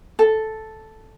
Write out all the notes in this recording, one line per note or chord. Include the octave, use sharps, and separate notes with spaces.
A4